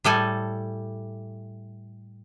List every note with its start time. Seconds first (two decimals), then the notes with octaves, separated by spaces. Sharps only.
0.04 A2 G3 A4 G#5